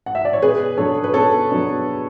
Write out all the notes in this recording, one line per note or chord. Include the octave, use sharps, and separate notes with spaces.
F#5
E5
D5
C#5
B2 G#4 B4
F#3 B3 D4 A4 C#5
B4
B2 A4 C#5
F#3 B3 D4